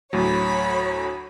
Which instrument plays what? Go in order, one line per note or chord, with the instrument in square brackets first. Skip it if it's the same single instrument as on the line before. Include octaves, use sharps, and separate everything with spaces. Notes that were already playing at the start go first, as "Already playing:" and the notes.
[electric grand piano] D2 A2 F#3 [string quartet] C#5 B5